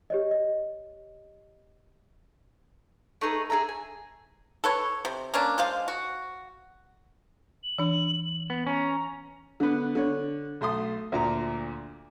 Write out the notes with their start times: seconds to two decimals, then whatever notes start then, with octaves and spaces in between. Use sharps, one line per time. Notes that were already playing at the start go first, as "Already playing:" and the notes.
0.10 G4 C#5 D#5
0.31 D#5
3.21 A3 D#4 G#4 B4
3.50 G#4 A4 E5 A#5
3.69 G#5
4.64 A4 B4 C#5
5.05 C3
5.34 A#3 C#4 D4
5.58 G#3 C5 F5
5.88 F#4
7.63 F#7
7.78 E3 D4
8.50 B3
8.67 C#4 A#5
9.60 D3 B3
9.95 D3 C#5
10.61 B1 A3 C6 D#6
11.12 D2 A#2 A#5